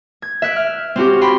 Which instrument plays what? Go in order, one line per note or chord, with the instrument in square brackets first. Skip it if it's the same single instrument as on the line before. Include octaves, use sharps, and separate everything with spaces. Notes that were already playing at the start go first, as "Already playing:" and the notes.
[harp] G#6
E5 F#6 D7
F6
C4 C#4 F#4 G4
G5 B5 C6